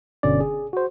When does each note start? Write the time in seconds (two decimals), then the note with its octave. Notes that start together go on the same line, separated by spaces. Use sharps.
0.23 G1 B2 D3 C#4 D5
0.41 G#4
0.73 F#4 C5